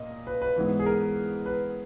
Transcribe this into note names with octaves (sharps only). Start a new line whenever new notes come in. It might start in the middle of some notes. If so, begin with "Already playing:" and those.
Already playing: A#2 A#3 D#5
B4
B4
G#2 E3 B3 E4
G#4
A#4
B4